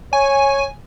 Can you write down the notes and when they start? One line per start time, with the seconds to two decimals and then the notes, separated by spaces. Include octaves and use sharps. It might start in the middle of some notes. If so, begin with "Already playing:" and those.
0.13 C#5 G#5